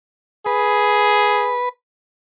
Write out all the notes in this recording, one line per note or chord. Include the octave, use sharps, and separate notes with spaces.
G#4 B4